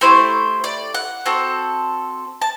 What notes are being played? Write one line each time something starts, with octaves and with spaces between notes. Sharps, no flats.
A3 E4 G4 C5
D5
F#5
C4 F#4 A4
A5